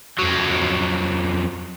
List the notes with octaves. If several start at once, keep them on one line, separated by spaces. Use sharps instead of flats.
F2 F#3